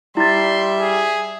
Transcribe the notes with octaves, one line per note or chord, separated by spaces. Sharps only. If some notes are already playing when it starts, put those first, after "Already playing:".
G3 E4 E5 C6 A6
G#4